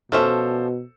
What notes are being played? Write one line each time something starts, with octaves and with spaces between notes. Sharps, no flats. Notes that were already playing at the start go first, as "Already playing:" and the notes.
B2 F3 C#4 A4 C5 E5